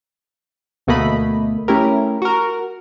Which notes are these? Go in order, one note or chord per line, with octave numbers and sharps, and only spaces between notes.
D2 B2 A3 A#3 D#5 B5
A3 C#4 E4 G4 A#4
F#4 A#4